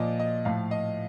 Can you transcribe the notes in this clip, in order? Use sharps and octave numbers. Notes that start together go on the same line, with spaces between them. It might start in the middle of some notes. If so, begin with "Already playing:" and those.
Already playing: A#2 F3 D5 D#5
D#5
A2 F3 F5
D#5